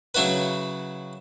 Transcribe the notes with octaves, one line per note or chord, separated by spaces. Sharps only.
C#3 F#3 E4 F#4 B4